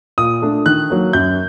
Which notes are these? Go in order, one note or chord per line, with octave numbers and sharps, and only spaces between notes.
A#2 D#6
A3 D4
D#3 F#6
F#3 A#3
F#2 G6